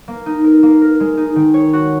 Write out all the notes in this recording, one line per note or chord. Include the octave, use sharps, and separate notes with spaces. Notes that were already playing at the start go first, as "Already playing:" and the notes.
A#3
D#4
A#4
A#3
A#4
G#3
D#4
D#3
C#5
F#4